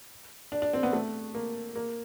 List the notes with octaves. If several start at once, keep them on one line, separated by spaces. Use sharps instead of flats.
D4
D4
C4
B3
A3
A#3
A#3